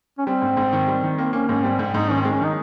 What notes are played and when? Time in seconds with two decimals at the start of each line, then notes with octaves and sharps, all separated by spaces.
0.18 C#4
0.26 G3 C4
0.42 G#2
0.57 G#2
0.73 D#3
0.88 G3
1.03 D#3
1.18 A#3 C4
1.33 A#3 C#4
1.49 G#2 C#4
1.64 G3 C4
1.79 G#2
1.94 G#2 D#4
2.10 D#3 C#4
2.21 G#3 C4
2.33 C#4
2.40 D#3 D#4